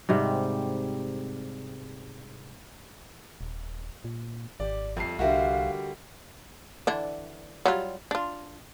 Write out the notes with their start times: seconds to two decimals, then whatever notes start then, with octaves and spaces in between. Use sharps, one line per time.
0.09 G#2 C3 G3
3.41 D#1
4.04 A#2
4.60 G#1 G4 D5
4.97 F2 G3 A3 C7
5.19 C2 D3 G3 F4 F#4 A#4 E5 F5
6.87 D3 E3 D4
7.66 F#3 G3 F4
8.11 D4 F4